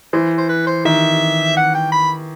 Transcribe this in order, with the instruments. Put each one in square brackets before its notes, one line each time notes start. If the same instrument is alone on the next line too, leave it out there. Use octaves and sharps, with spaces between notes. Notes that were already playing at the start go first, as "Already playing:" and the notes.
[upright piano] E3 [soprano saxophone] C5
[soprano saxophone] C5
B4
C5
[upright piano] D#3 [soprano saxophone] E5
[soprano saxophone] F#5
G5
B5